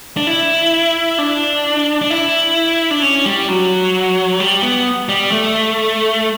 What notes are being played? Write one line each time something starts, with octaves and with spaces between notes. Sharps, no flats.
D4
E4
D4
D4
E4
D4
C#4
G3
F#3
G3
B3
G3
A3